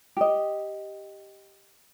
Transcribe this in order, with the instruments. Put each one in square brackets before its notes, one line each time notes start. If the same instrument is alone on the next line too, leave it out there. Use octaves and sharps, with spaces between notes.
[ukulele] G4 D#5